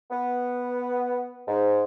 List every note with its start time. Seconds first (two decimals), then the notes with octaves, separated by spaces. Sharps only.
0.11 B3
1.48 G#2